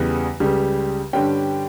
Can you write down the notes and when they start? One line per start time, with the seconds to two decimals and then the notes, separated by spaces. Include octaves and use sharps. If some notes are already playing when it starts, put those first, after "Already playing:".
Already playing: E2 C#3 E3 G3 B3
0.40 C#2 C#3 G3
1.13 G2 D3 G3 C#4 G5